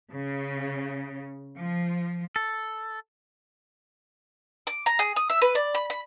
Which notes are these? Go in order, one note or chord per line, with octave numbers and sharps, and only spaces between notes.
C#3
F3
A4
D6
A#5
G#4
D#6
E5
B4
D5
B5
B5